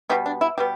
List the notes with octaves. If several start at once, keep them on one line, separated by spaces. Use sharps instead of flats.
B2 G3 B3 G4
D4
E4
B2 G3 B3 G4